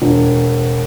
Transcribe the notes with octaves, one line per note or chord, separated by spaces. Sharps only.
E1